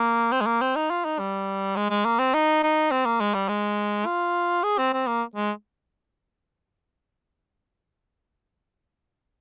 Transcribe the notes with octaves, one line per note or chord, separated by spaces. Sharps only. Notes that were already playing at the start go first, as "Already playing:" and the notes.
Already playing: A#3
C4
G#3
A#3
C4
D#4
F4
D#4
G3
G#3
G#3
A#3
C4
D#4
D#4
C4
A#3
G#3
G3
G#3
F4
G#4
C4
C4
A#3
G#3